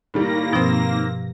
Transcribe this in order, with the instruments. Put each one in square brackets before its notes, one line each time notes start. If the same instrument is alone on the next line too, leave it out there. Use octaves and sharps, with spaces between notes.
[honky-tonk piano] A2 D#3 G3 [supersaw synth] A#3 A#6
[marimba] G2 B2 F3 [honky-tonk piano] D#3 C4